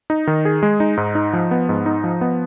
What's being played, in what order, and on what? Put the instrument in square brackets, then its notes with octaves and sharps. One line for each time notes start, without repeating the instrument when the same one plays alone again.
[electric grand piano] D#4
D#3
G#4
G#3
D#4
G#2
D#4
F3
B3
G#2
D#4
F3
B3